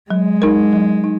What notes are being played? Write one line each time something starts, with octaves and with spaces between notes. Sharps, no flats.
F#3 G#3
D#4 A#4
F#3
D#4